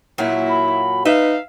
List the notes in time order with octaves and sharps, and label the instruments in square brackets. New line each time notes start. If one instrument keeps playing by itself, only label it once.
[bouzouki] A#2 F#3 F#4 [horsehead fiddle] E4
[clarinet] B5
[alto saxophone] D#4 [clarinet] B4 [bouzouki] E5 [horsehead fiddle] F5